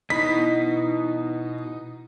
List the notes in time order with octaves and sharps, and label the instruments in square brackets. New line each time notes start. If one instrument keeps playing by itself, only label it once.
[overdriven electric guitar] B2 B5 [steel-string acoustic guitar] E3 [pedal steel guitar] D#4 [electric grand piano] B6